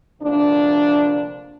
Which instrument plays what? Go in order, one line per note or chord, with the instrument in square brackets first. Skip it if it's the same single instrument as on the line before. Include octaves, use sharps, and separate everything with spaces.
[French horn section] D2 C3 F3 A#3 D4